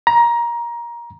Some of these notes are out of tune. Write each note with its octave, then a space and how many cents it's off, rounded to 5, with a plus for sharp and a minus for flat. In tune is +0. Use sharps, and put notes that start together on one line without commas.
A#5 +20